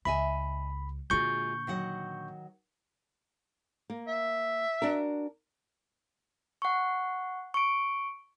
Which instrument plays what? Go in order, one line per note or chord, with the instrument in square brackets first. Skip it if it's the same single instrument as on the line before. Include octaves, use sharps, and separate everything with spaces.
[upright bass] C#2 [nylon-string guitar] D#5 E5 G#5 [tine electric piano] B5
[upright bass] A#2 D3 [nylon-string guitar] G#3 F4 F#4 [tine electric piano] C#6 G6
[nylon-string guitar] D#3 F#3 F#5
A#3
[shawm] E5
[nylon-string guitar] D4 F#4 A#4
[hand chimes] F#5 C#6
C#6 D7